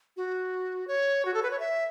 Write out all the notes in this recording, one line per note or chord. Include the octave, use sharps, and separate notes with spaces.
F#4
C#5
F#4
A4
B4
C#5
E5